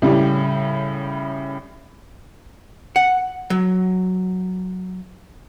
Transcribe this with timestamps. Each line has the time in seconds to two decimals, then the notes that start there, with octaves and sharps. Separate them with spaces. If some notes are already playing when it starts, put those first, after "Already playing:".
0.02 A2 C#3 G3
2.96 F#5
3.50 F#3